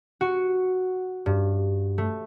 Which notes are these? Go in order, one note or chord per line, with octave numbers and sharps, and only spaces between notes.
F#4
G2
A3